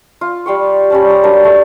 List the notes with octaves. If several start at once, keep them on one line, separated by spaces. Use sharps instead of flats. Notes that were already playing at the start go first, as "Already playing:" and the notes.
F4
G3 F5 G5 C#6
G3 C#4 A5
A#5
F#3 G3 A#3 D4
A3 F5